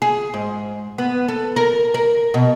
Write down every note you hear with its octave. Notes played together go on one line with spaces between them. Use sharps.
G#4
G#2
B3
A4
A#4
A#4
B2